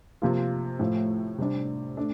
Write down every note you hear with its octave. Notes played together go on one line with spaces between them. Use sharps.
C3 F3 A#3 F4
A2 F3 A3
C3 G3 D4
A3 D4